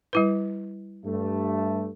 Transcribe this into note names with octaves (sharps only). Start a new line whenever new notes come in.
G3 E4 B4
G2 A3